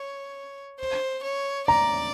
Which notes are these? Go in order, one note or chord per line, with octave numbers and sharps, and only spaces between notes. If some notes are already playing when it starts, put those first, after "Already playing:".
Already playing: C#5
C5
C#5
D5 A#5